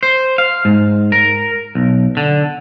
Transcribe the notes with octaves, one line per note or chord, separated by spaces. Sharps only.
C5
F5
G#2
A#4
B1
D3